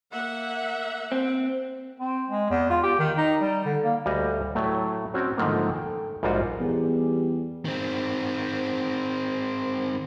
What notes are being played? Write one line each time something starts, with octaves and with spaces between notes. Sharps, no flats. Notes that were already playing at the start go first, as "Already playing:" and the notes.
A#3 E5 F#5
C4
C4
G#3
E2
F4
G4
D#3
D#4
G3
D3
A#3
D2 G3 F#4 D#5
A2 F#3 A3
C4 C#4 F#4 D5
G#2 D3 D#3 F3 A3 A#3
A4 G5
A#1 G#2 G3 F4 F#4 F#5
E2 G3 G4 G#4
D#3 C4